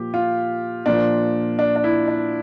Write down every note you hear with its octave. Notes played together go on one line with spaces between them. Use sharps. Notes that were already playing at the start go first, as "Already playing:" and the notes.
Already playing: A#2 F3 G4
F4
A#2 F3 D4
D4
D4
E4
D4